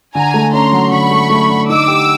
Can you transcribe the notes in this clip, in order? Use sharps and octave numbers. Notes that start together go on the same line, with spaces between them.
D3 G#5 A#5
A3
C#4 A#5 C6
F#3
D3 B5 C#6
A3
A3
D3
D#4 D6 E6
G4